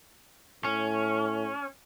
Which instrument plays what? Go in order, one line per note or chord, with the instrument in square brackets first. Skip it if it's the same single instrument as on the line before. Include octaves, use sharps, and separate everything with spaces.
[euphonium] A2 [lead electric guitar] C#4